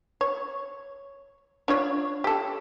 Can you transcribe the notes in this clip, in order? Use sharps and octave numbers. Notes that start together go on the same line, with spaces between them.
C#5
D4 F4 C#5
G4 A4